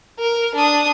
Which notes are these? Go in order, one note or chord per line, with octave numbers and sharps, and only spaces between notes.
A#4
D4 D#6